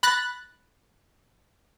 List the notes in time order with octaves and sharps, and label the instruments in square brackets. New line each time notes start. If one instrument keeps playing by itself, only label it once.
[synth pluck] B5 F#6 A6 A#6